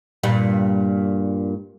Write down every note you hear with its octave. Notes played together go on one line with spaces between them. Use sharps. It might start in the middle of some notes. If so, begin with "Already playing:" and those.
G2 A#2 G3